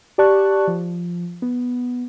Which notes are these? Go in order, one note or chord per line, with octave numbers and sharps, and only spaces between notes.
G4 D5 A5 C#6 F#6
F3
B3